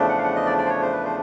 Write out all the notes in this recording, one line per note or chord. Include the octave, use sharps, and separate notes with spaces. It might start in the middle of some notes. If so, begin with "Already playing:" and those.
Already playing: E2 C#3 F3 A3 D4
F#5
F5
F#5
D#5
D5
D5
C5
C#5
C5
B4
C5